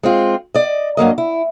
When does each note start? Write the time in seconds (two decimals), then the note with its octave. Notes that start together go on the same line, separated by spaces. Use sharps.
0.03 G#3 C4 F4
0.54 D5 D#5
0.97 G2 F#3 A#3 D#5
1.18 E4